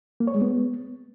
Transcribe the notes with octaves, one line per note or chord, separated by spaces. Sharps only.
A#3
C#5
G#3
B3